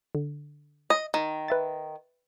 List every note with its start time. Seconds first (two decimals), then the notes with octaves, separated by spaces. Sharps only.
0.15 D3
0.90 D#5
1.14 D#3
1.48 B4 E5 A6